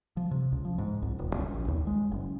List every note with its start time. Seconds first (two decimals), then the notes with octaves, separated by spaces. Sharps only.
0.17 F3
0.31 C3
0.52 C#2
0.65 F3
0.78 G#2
1.02 C2
1.19 D#1
1.35 C#2
1.53 A#1
1.68 D#2
1.87 G#3
2.11 F#1